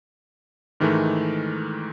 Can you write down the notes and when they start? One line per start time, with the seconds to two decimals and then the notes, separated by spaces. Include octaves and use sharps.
0.80 G#2 D#3 E3 G#3 A3